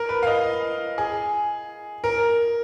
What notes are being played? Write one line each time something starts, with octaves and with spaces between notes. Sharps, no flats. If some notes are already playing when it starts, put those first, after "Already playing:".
Already playing: A#4
B4
F5
D#5
G#4
A#4